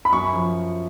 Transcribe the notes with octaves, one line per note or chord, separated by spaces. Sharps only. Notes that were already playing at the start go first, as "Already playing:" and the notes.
B5
F#2 C#6
F3